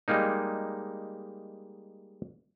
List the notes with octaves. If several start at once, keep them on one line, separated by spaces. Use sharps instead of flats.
G3 G#3 A#3 D#4